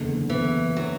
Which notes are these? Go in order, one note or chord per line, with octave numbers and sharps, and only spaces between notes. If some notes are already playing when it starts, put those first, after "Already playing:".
Already playing: F#1 E2 D3
E3
F#3